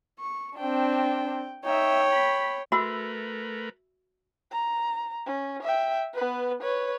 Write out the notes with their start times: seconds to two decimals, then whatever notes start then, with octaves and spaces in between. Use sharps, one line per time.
0.20 C#6
0.58 C4 D4 G5
1.65 D#4 C#5 E5 G5
2.12 B5
2.72 A3 F#4 A#4 B4 E5 B5 E6
4.51 A#5
5.26 C#4
5.63 E5 G5
6.14 B3 B4
6.61 B4 C#5